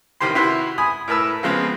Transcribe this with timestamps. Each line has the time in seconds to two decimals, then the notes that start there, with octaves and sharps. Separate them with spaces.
0.21 A1 D#3 G4 C5 C6
0.35 C3 E4 F#4 B4 C6
0.78 G#5 B5 D#6
1.08 A2 A#4 B4 A5 E6
1.43 C#3 F3 G#3 B3 C4